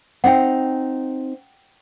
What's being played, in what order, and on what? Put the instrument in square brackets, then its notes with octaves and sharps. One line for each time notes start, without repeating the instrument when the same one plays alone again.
[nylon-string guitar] C4 D#4 [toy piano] F#5 G5